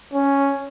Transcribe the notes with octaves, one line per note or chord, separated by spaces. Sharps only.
C#4